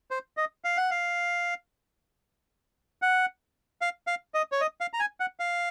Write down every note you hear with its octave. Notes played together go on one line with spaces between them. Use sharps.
C5
D#5
F5
F#5
F5
F#5
F5
F5
D#5
C#5
D#5
F5
A#5
G#5
F#5
F5